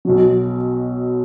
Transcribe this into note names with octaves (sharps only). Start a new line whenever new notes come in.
B1 B2 F#3